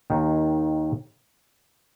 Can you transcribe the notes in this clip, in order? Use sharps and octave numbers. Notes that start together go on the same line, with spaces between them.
D#2 D#3